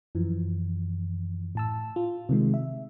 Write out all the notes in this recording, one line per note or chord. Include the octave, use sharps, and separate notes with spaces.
F#2 E3 F3
A2 A5 E6
F4
C3 D#3 G#3
E5